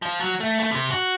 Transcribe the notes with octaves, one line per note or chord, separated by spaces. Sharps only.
F3
F#3
A3
A3
C3
F#4